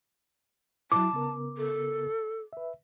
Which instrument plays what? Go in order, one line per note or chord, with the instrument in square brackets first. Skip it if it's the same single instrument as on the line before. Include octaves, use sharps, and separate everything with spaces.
[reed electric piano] F#3 E4 [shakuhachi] A5 [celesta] D6
[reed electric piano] C#3 B3 A#4
[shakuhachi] A4
[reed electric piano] B4 E5